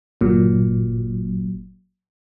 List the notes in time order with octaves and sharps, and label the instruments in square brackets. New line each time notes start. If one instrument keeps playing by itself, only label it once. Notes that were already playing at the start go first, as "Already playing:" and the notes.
[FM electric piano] G1 A#2 F#3